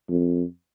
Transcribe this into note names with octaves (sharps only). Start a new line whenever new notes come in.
F2